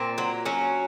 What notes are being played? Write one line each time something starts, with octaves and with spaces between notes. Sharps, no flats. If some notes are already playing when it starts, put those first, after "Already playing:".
Already playing: A#2 C4
F#3
F#3 C#4